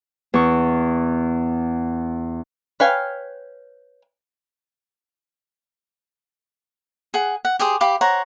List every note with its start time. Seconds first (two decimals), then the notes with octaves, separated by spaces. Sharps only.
0.34 E2 C#6
2.80 B4 C#5 F5 G5 G#5
7.14 G#4 F#5
7.45 F#5
7.59 G4 G#4 C5 D#6
7.81 G4 F5 B5 D6
8.01 C5 C#5 F#5 A#5